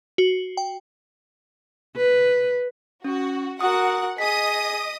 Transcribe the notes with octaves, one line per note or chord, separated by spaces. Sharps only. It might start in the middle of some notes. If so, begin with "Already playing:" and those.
F#4
G5
B4
C#4 F#4
F#4 A#4 F#5 D#6
G#4 D#5 D#6 B6